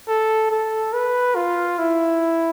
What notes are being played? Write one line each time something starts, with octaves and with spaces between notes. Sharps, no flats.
A4
A4
B4
F4
E4